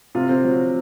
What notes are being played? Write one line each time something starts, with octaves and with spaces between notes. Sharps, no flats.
C3 F4
C4
F#3